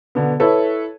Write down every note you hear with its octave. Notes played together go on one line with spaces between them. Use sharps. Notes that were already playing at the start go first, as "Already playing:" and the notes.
B2 D3 B3
E4 A4 B4 C#5